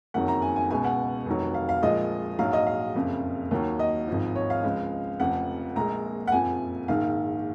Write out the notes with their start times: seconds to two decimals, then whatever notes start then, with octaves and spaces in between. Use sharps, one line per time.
0.14 F#1 F2 D#3 F#3 F#5
0.28 A#5
0.42 G#5
0.56 G#5
0.70 C#2 B2 G#3 G#5
0.84 F#5
1.26 F1 F2 D#3 F#3
1.54 F5
1.69 F5
1.82 A#1 A#2 F3 G#3 D#5
2.39 A#1 G#2 F#3 F5
2.53 D#5
2.67 F5
2.95 F#1 F2 C#3
3.51 D#2 D#3 F#3
3.79 D#5
4.07 G#1 G#2 F3
4.36 C#5
4.50 F5
4.64 C#2 C#3 F3 G#3
5.20 F1 F2 C#3 F3 F#5
5.76 A#1 A#2 G#3 A#5
6.28 F#5
6.32 F#1 F2 F3 G#5
6.88 A#1 G#2 D#3 F5